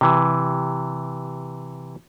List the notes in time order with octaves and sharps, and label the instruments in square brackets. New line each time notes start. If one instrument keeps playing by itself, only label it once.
[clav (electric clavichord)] C3 E3